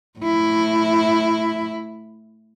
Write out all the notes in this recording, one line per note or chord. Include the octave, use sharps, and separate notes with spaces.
A2 E4